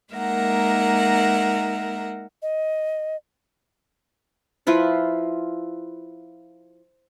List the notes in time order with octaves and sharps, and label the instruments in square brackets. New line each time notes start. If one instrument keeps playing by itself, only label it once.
[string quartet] G#3 A#3 D#4 A#4 E5 F#5
[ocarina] D#5
[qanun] F3 E4 F4 B4